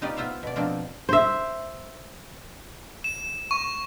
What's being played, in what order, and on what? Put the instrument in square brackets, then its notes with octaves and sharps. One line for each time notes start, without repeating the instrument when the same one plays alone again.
[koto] D#4 F4 G4 B4 D5
B3 F4 C5 E5 F5
B2 D5
B2 F3 A#3 C4 D4
[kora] C5 E5
[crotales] E7
C#6